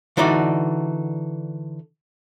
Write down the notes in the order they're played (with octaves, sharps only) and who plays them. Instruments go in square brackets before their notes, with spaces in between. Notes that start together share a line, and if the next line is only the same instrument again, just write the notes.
[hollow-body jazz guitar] D3 E3 D4 D#4 F#4 D5